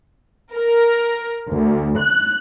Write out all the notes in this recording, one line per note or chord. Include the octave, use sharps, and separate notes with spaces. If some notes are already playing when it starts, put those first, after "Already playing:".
A#4
D2
F#6